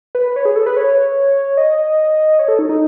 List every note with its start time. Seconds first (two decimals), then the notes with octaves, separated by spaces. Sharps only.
0.15 B4
0.36 C#5
0.45 G#4
0.56 A4
0.66 B4
0.77 C#5
1.57 D#5
2.39 C#5
2.48 A4
2.59 D#4
2.69 D#4